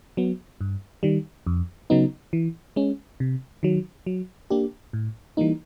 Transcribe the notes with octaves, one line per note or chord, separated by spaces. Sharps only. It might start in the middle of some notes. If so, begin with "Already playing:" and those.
F#3 B3
G2
D#3 G3
F2
C#3 F#3 B3 D#4
E3
G#3 C#4
C3
D#3 F#3
F#3
A#3 D4 G4
A2
E3 G3 A#3 D#4